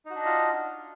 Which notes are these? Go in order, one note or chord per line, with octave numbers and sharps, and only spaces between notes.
D4 D#4 F4 F#4 D#5